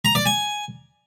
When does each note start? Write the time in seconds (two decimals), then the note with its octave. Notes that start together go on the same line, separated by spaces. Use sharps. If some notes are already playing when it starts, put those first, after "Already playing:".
0.05 A#5
0.15 D5
0.26 G#5